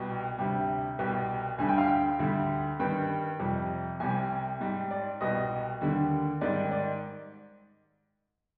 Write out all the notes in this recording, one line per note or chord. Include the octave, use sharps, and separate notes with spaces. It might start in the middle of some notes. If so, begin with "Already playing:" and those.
Already playing: C2 B2 G3
D2 C3 G3
C2 B2 G3
D2 D3 G3 G#5
G5
F5
G5
D2 D3 G3
G2 D#3 G3 G5
F2 C3 G3
C2 C3 G3 G#5
G#2 G3
D5
C2 B2 G3 D#5
D#2 D3 G3
G#2 D#3 G3 D5
D5